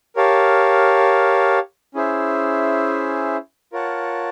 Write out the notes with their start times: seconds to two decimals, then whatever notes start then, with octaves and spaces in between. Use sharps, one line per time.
0.16 G4 A#4 C#5 F5 A5
1.94 C#4 E4 G#4 C5 E5
3.73 F4 A#4 C#5 F#5 A5